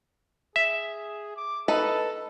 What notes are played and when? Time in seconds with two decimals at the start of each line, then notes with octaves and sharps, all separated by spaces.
0.56 G#4 E5
1.36 D6
1.68 D#4 A4 B4 A5